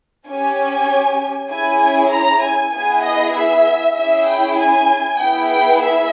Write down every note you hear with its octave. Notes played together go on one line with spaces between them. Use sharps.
C#4 G4 G#5
C#4 E4 G#4 G#5
A#5
G#5
B3 E4 G#4 G#5
D#5
E5
C#4 E4 G#4 E5
G5
G#5
B3 E4 G#4 G5
G5
E5